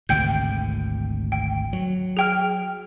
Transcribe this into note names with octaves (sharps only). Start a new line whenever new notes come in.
G#1 D2 C3 G5 G6
G5
F#3
G#4 G5 F6